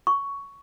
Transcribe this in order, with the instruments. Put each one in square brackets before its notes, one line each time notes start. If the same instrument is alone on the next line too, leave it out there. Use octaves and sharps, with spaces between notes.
[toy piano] C#6